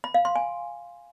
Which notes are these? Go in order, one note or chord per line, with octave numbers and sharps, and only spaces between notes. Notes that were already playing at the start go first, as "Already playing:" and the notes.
B5
F5
C6
G#5